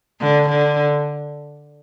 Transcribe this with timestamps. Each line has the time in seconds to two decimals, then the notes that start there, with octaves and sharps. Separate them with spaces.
0.21 D3
0.50 D3